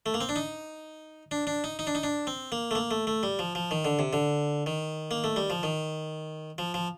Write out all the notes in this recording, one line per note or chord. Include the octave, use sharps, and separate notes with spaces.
A3
A#3
C4
D4
D#4
D4
D4
D#4
D#4
D4
D#4
D4
C4
A#3
A3
A#3
A3
A3
G3
F3
F3
D#3
D3
C3
D3
D#3
A#3
A3
G3
F3
D#3
F3
F3